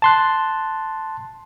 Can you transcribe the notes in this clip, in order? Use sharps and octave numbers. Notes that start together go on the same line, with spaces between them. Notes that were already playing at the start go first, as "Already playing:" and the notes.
A5 C6 F#6